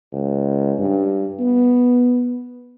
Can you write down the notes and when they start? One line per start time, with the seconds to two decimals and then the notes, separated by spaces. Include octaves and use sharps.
0.13 C#2
0.79 G2
1.39 B3